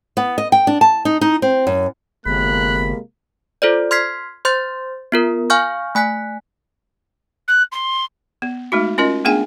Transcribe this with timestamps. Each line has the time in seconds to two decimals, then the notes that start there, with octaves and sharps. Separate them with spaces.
0.17 B3
0.38 D#5
0.52 G5
0.67 D4
0.81 A5
1.05 D#4
1.21 D#4
1.42 C4
1.67 F#2
2.26 G1 C3 G#3 A#3 B5 F#6
3.62 F4 A4 C5 D5
3.91 C6 F6 G#6 B6 C7
4.45 C5 C6 G6 A6
5.12 B3 F4 A#4
5.50 F5 G#5 C#6 F6 G6
5.95 A3 G#5 F#6 B6
7.48 F#6
7.72 C6
8.42 B3
8.72 G#3 A3 D#4 F#4
8.98 C#4 F4 A#4 D#5
9.25 A3 B3 D4 G#4 G5 G#5